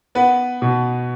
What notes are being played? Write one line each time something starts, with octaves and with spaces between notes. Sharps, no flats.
B3 B4
B2